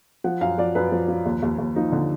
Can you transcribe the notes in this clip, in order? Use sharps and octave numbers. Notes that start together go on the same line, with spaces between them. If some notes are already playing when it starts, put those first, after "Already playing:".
F3 F#5
F#2 F5
F3 D5
F#2 B4
F3
F3
D#2
D#2
D#2
F3 D#4
D3